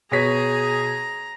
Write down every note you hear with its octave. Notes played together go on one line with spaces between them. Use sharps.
B2 G#4 C#5 A#5 B6